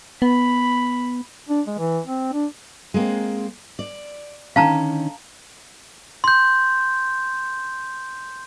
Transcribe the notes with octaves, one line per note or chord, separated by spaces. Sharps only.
B3 B5
D4
G#3
E3
C4
D4
G#3 A#3 C4
D5
D3 D#3 C#4 F5 A5 A#5
C6 G6